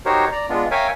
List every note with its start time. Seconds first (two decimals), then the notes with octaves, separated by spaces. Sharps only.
0.06 D#4 F#4 G4 A#4 C5 C#5
0.32 D5 A#5
0.49 G#3 B3 D4 F4
0.71 A#4 C#5 E5 F5 G5 G#5